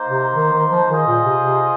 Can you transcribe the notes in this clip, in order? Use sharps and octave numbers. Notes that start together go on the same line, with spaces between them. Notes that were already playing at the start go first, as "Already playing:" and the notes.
Already playing: A#3 D#4 C5
C3
D#3
D#3
F3
D#3 F4 G#4 C5 D#5
A#2
C3
C3